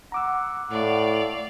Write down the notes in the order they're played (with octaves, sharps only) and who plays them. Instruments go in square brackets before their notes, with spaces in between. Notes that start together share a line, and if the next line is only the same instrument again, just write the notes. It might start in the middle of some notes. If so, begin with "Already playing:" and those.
[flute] F#5 [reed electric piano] A#5 D6 E6
[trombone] A2 [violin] D5 F5